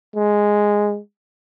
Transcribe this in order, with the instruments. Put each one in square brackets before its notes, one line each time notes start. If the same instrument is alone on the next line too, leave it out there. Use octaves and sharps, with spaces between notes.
[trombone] G#3